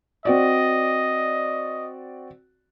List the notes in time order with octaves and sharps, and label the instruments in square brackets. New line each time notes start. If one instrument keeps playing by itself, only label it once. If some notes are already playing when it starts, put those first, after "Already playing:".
[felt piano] C4 F#4 D5 [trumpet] D#5